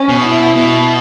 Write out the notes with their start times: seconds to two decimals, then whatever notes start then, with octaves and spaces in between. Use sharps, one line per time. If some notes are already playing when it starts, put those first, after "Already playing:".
Already playing: C#4
0.09 B2
0.24 E4
0.56 B2